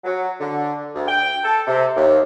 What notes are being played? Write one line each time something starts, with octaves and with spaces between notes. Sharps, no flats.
F#3
D3
D2
G5
A4
C3
D#2